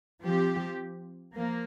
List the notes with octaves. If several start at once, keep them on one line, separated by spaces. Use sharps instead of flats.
F3 C4 G4
F3 A#3